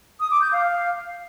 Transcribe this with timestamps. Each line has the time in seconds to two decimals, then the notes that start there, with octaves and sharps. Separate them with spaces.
0.20 D#6
0.31 D6
0.42 G6
0.52 F5